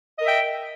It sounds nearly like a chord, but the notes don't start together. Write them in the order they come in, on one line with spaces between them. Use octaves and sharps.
D#5 A#4 E5 G5